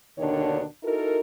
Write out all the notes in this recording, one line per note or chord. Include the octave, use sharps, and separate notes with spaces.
D#2 B2 D3 D#3 D4 C#5
D#4 E4 F#4 A4 A#4